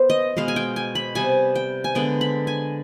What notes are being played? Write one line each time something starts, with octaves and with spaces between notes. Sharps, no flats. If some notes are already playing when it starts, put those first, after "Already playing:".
Already playing: B3 C5
D#5
B2 G#3 B3 F5
G#5
G5
G#5
B5
C3 G3 B3 G#5
G5
G#5
D3 G#3 B3 G5
B5
G#5